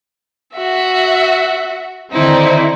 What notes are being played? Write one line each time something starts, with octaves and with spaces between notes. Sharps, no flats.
F#4 E5
D3 D#3 C4 D#4 E4